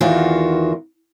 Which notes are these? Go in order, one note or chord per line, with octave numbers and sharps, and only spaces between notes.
E2 D#3 E3 F4 F#4 A#4